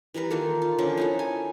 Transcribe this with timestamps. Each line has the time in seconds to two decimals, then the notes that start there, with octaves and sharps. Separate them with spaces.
0.14 E3 G3 A#4 B4
0.30 D#3 A#3 F4 A4
0.62 F4
0.79 D3 F3 C#4
0.97 D#4 E4 A4
1.19 G#5